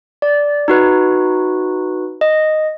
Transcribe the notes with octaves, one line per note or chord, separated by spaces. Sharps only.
D5
D#4 F#4 B4
D#5